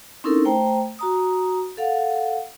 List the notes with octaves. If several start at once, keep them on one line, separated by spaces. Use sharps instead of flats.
C4 C#4 D#4 E4 A4 A#4
A3 C5 G5 A#5
F#4 A#5 D#6
A4 F5 F#5